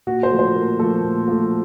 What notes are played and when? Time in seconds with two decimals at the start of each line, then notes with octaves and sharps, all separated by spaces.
0.07 A#2 F#4
0.23 C5
0.31 F3 A3
0.39 C5
0.55 A#2 A#4
0.79 F3 A3 A4
1.03 A#2
1.28 F3 A3